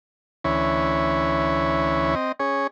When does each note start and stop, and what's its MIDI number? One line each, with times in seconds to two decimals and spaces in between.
0.44 2.15 38
0.44 2.15 52
0.44 2.15 61
0.44 2.15 64
0.44 2.15 73
2.15 2.32 60
2.15 2.32 75
2.40 2.67 61
2.40 2.67 68
2.40 2.67 73